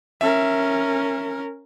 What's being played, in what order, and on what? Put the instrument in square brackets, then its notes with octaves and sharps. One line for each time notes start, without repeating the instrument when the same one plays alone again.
[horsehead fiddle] C#4 A#4 [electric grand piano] E5